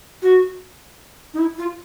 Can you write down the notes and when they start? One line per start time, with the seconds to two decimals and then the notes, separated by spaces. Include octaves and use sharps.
0.22 F#4
1.34 D#4
1.38 E4
1.58 F4